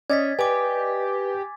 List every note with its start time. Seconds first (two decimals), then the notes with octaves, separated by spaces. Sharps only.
0.10 C#4 D5 D#5 G#6 A6 B6
0.39 G4 B4 G#5 D6